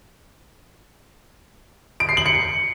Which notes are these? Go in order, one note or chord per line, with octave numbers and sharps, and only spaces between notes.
D7
C7
F#7
C#7